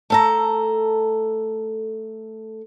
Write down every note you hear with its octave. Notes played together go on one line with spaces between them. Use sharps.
A3 A4 A#5